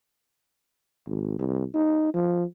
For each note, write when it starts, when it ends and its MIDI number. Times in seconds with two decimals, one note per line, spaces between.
1.07 1.36 32
1.39 1.64 36
1.75 2.14 63
2.14 2.44 53